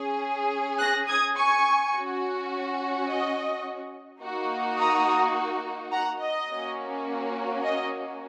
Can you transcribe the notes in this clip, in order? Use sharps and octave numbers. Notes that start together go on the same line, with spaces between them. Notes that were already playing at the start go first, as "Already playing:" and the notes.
Already playing: C#4 G#4
F#6 A#6
D#6 G#6
G#5 C#6
C#4 F#4
D#5
A#3 D#4 F#4
A#5 D#6
F#5 A#5
D#5
A#3 C#4 F#4
D#5